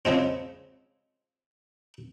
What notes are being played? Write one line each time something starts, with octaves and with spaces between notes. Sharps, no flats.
C#3 F3 G#3 C4